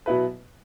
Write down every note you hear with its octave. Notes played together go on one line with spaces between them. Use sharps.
B2 F#3 B3 E4 B4